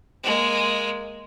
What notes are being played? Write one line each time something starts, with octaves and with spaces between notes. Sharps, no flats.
G#3 A#3